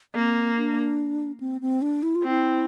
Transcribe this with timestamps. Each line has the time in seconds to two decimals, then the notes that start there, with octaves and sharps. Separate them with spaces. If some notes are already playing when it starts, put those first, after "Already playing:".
0.15 A#3 C4
0.57 D4
1.40 C4
1.61 C4
1.82 D4
2.03 E4
2.15 F4
2.23 C4 E4